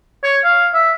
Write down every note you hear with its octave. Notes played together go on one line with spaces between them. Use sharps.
C#5
F5
E5